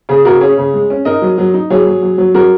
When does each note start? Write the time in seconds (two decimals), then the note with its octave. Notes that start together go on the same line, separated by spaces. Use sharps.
0.09 C#3 G#4
0.25 C#3 F#4 A#4
0.41 C#4 G#4 C#5
0.57 C#3
0.74 G#3
0.90 C#4
1.05 D#4 A#4 D#5
1.22 F#3
1.38 F#3
1.54 D#4
1.70 F#3 G#4 C#5
1.87 F#3
2.03 F#3
2.18 F#3
2.34 F#3 F#4 A#4